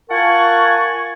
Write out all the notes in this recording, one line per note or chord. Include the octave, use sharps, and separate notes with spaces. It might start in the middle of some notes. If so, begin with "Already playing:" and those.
F4 A#4 F#5 G#5 A5 C#6